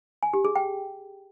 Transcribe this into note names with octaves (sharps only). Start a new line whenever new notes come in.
G#5
G4
G#4
G5